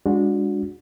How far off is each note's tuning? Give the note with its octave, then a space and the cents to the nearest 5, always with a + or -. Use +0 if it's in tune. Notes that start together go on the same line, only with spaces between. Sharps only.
G#3 -25 D4 -10 F#4 -30